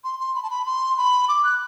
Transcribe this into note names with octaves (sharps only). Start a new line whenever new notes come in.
C6
C6
B5
A5
B5
C6
B5
D6
F#6